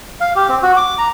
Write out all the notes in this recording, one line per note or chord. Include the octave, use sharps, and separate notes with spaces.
F5
G4
C4
F#4
D6
A#5